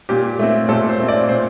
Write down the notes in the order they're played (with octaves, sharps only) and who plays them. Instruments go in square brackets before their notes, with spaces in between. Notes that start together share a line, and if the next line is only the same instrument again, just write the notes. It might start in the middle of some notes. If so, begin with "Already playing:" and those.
[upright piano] A#2 G4
A3 C4
A#2 A4
C5
A3 C4
D5
A#2 C5